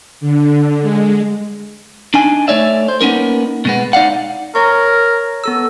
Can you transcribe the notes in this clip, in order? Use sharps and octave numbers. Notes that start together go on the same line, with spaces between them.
D3
G#3
D4 D#4 G#5
A3 C#5 D5 E5
C5
A#3 B3 C#4 D#4 A#4
B2 G#3 B3
D#4 D5 F5 F#5
A#4 C#5 C#6
B3 A4 E6